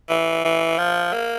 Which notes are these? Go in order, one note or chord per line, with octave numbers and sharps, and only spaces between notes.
E3
E3
F3
A#3